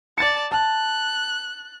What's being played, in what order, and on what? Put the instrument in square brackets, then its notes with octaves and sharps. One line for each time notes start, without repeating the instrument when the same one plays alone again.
[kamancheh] D5 A5 [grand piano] A6 C#7
[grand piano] A5 [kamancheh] F#6